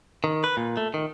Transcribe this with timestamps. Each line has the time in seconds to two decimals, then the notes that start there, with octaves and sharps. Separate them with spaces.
0.24 D#3
0.44 B4
0.57 A#2
0.77 A3
0.94 D#3